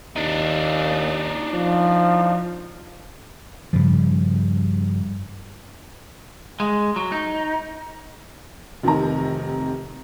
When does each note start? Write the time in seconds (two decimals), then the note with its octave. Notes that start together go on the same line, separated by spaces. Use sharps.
0.16 D#2 D4 D#4
1.54 F3
3.73 G2 C#3 F3
6.60 G#3
6.96 F#3
7.12 D#4
8.83 F1 C3 D#3 A#5